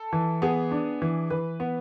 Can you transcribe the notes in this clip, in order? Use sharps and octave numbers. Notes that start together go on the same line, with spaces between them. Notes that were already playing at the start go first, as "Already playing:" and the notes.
Already playing: A4
E3
B3 G#4
D4
E3
E3 B4
B3